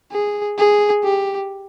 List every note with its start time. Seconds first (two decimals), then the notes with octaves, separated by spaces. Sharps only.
0.12 G#4
0.58 G#4
1.04 G4